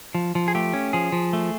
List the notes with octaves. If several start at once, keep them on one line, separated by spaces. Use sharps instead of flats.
F3
F3
G#4
A3 G4
C#4
F3 G#4
F3
A3